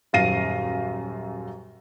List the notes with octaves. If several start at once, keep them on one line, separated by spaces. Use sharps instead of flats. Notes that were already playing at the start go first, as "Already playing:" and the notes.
D#1 F#2 F5 A#6 C7 D#7